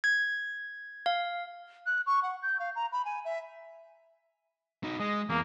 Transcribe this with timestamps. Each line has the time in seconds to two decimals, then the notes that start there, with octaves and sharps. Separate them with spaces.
0.04 G#6
1.06 F5
1.86 F#6
2.06 C#6
2.23 F#5
2.42 G6
2.60 F5
2.75 A#5
2.92 B5
3.05 G#5
3.25 E5
4.84 D#4 F#4
5.00 G#3 D#5
5.29 E2 A#3